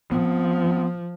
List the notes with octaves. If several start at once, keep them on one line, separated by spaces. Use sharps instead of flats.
F3 B3 C4